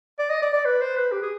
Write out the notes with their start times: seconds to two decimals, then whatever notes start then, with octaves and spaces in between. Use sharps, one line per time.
0.19 D5
0.30 D#5
0.42 D5
0.53 D5
0.65 B4
0.81 C5
0.97 B4
1.12 G4
1.22 G#4